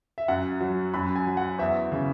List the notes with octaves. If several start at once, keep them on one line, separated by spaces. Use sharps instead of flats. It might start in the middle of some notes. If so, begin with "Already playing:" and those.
E5
F#2 F#5
F#3
F#2 B5
G#5
F#3
F#5
E2 E5
C#3